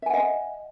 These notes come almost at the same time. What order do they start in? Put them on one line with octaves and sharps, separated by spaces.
E5 G#5 F#5 D#5